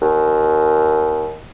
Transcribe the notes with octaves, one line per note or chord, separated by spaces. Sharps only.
D#2